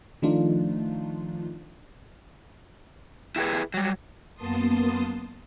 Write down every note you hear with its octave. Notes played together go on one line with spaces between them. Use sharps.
D#3 F3 A3 D4 D#4 F4
E4 G4 G#4 B4
F#3 G3
F#2 A#3 B3 A5 C6 D#6